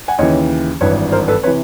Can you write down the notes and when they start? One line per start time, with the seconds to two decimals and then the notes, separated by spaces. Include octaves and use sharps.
0.08 F#5 G#5
0.19 D#2 C#3 E3 C#5 D#5
0.81 G#1 G2 E3 B4 C#5
1.12 A#4 C5
1.28 A4 B4
1.43 C3 E3 B4 C#5